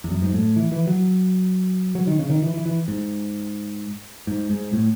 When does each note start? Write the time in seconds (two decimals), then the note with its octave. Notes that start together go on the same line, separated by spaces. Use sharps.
0.04 E2
0.11 F#2
0.22 G#2
0.34 A2
0.56 E3
0.72 E3
0.87 F#3
1.95 F#3
2.07 D#3
2.19 C#3
2.30 D#3
2.42 E3
2.54 E3
2.66 E3
2.88 G#2
4.27 G#2
4.50 G#2
4.73 A2